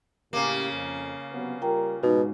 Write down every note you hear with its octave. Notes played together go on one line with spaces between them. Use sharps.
A2 C#3 A#3 G4
F2
C3 F#3 B3
G3 F4 A#4 G5 A#5
G#2 B2 G#3 D#4 F#4